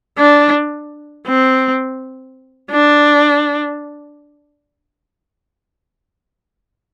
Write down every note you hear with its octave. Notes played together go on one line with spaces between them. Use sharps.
D4
C4
D4